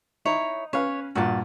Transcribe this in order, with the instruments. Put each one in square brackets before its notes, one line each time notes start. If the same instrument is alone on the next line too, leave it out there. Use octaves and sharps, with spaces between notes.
[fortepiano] D#4 [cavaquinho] E4 C#5 A#5
[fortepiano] C#4 B4 F5 [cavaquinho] C#5
[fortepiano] G2 A#2 [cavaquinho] F#4 A5